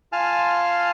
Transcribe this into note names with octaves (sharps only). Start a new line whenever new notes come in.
F4 F5 G#5 A5 F6